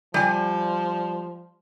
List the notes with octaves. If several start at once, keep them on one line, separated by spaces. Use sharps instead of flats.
F3 G3 G#5